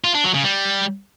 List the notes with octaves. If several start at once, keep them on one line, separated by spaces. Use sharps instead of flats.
F4
D4
F#3
C#3
G3